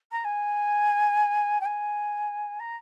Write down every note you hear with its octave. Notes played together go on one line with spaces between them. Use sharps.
A#5
G#5
G5
G#5
A#5